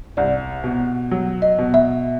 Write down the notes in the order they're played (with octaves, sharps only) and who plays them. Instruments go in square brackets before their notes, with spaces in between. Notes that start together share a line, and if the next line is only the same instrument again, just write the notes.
[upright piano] C2 [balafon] D5
[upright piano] B2
F#3
[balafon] D#5
[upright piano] B2
[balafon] E5